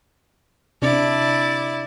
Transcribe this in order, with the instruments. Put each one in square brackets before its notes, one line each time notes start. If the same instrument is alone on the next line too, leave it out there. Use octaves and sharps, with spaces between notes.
[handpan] C3 D4 [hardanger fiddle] E4 D5